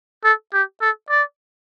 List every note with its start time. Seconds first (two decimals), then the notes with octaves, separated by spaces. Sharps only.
0.24 A4
0.54 G4
0.81 A4
1.10 D5